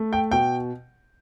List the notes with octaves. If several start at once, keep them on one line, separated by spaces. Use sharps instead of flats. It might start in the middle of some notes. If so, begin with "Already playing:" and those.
Already playing: A3
G5
B2 G5